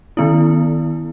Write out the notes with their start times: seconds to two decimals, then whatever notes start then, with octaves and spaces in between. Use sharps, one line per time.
0.17 D#3 B3 E4